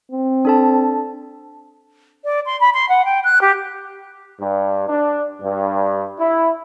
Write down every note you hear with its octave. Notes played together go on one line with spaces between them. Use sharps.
C4
D4 A4 A5
D5
C6
B5
C6
F#5
G5
F#6
G4
G2
D4
G2
E4